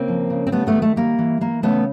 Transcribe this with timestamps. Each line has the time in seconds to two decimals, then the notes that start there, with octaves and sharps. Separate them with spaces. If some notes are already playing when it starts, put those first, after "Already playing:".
Already playing: C#3 A#3 C4
0.08 F3
0.30 C#3
0.47 C4
0.52 G3 A3 B3
0.67 A3 B3
0.75 D#3
0.82 A3
0.96 G3 A#3
1.19 E3
1.41 E3 A#3
1.63 C#3 A3 B3